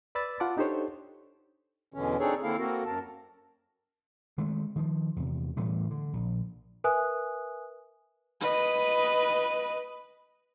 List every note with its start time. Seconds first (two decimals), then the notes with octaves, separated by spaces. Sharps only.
0.15 B4 D5 B5 E6 A6
0.40 F4 F#5 A5 D6
0.57 D4 D#4 G4 A4 C5 C#5
1.94 E2 B2 D3 E3 C#4
2.19 C4 D4 D#4 G#4 A4 C#5
2.43 D3 A#3 C4 E4 A4 F5
2.59 A#3 C4 F#4 A4 A#4
2.85 F#2 A#4 A5
4.38 D#3 G#3 A3
4.76 D#3 F3
5.16 E2 C3
5.57 A2 E3 G3 A3
5.91 D3
6.13 A#1
6.84 A#4 B4 E5 G#5 D#6 F#6
8.41 B4 D#5